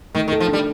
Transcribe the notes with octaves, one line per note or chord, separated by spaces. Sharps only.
D#3 A3
D#3
A4
F3
G3 D4